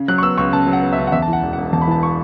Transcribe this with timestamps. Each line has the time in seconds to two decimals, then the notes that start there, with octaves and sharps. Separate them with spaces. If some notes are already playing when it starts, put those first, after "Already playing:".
Already playing: C#3
0.08 F#3 F#6
0.18 C#6
0.22 B3 E6
0.37 C#2 C#6
0.53 C#3 A5
0.67 F#3
0.73 F#5
0.82 B3
0.92 E5
0.98 C#2
1.07 F#5
1.12 E2 E5
1.22 A5
1.28 E3 F#5
1.43 E1
1.53 F#5
1.58 E1
1.73 E2 A5
1.82 B5
1.87 E3 A5
2.03 C#6